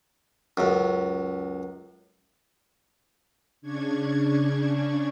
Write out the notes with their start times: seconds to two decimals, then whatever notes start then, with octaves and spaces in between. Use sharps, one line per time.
0.57 C#2 F#2
3.62 C#3 D4 C#6 G#6